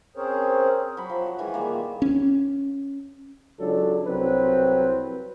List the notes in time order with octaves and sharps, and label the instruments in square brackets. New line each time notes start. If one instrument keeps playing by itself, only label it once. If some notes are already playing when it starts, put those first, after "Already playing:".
[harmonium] C4 C#4 G#4 A#4 C5 C#5
[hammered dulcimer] F#3 B5
F3 G4
F#4 F#5
D#3 E3 G#3 G#5
G3 G#3 A#3
A#2
[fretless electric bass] C#4
[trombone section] C#2 F#3 D4 A4
C2 F#3 C4 B4